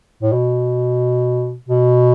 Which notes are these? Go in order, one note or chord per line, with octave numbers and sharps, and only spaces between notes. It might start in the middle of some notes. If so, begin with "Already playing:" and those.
A2
B2
B2